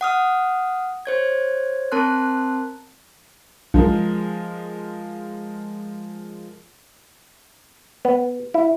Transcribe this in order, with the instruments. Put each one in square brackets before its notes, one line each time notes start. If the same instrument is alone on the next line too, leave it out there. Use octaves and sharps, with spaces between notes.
[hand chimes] F#5 D#6 F6
C5 C#5 G#6
C4 A#4 A5 C6 F#6
[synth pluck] B1 [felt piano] F3 G#3 A#4
[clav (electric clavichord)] B3
E4